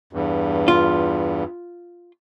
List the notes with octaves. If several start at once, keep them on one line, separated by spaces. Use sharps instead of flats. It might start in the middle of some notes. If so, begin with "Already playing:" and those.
E2 G2
F4